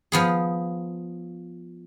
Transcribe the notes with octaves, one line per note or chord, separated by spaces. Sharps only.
F3 B3 G#4